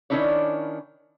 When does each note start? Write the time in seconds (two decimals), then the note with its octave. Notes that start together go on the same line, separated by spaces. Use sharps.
0.10 D#3 C#4 D4 E4 C#5